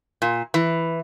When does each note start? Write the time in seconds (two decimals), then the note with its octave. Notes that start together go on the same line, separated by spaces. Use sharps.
0.22 A#2
0.54 E3